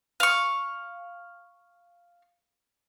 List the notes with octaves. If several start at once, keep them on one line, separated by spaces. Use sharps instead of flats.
F5 C#6